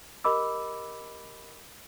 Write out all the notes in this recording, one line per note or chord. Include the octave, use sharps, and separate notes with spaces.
G4 A#4 D#5 B5 D6 E6